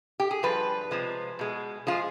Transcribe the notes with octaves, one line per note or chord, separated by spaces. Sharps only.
G4
G#4
G2 F3 B4
C3 F3 G#3
B2 G#3
F3 G#3 F4 G#4